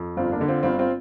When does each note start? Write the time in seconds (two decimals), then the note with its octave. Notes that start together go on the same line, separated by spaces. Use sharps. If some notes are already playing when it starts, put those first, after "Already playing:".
Already playing: F2
0.17 G1 C4 F4
0.32 A#3 D4
0.41 D3
0.48 C4 F4
0.63 G1 C4 F4
0.79 C4 F4